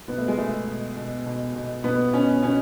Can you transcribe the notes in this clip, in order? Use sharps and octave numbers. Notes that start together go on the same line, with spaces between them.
B2 B3
A3
G#3
B2 A3
B2
B2
B2
B2
B2 B3
B2 C#4
B2 C#4